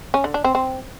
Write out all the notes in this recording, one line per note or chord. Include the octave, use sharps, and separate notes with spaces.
C#4
D3
D4
C4
C4